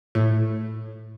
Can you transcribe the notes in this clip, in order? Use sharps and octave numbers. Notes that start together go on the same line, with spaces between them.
A2